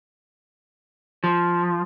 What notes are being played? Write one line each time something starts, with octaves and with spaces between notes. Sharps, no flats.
F3